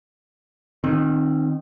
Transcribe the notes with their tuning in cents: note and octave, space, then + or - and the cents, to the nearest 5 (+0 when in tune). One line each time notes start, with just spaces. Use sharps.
D#3 -15 C4 +20